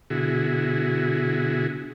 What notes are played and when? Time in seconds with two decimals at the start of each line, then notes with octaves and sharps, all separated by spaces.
0.10 B2 D3 E4 F#4 G#4